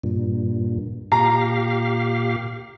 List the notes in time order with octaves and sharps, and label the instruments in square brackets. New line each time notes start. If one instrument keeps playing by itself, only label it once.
[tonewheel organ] G2 A#2
[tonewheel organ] A#2 G4 F5 [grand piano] A#5